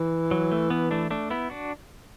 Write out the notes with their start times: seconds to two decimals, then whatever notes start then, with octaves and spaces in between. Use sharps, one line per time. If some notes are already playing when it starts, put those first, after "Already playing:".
Already playing: E3
0.31 F#3
0.52 A3
0.70 B3
0.91 A3 D4
1.11 A3 D4
1.30 B3 E4
1.50 D4 F#4